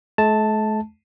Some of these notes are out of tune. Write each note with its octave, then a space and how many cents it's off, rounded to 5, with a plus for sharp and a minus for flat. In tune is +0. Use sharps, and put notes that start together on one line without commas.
A3 -45 A5 +0